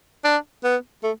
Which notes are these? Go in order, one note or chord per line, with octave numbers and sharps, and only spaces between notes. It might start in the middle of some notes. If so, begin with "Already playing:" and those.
D4
B3
A3